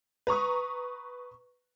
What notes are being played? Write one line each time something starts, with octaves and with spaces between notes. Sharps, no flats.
B4 A#5 C#6 D#6